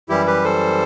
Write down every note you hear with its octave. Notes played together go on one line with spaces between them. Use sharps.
F#2 E3 G3 E4 G4
G4 B4
A4 C5